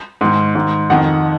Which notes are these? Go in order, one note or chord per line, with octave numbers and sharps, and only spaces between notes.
G#2 D#3
G#2 D#3
F2 D#3 F#5